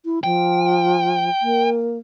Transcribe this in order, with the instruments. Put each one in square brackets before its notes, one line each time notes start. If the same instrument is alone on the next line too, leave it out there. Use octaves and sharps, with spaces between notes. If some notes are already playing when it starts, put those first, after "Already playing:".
[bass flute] E4
[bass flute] F3 [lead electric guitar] G5
[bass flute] A#3